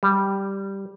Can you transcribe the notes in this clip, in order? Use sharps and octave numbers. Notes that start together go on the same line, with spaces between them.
G3